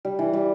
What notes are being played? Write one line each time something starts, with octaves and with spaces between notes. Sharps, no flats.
G3
E3
G3